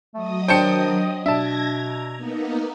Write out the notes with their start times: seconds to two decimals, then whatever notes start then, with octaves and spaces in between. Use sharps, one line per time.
0.14 F#3 A3 D#5 D#6
0.48 D#3 D4 C5 C#5 G5 A5 C#7
1.26 B2 D4 E5 A5 G#6 A#6
1.67 A#5
2.15 A#3 B3 D#4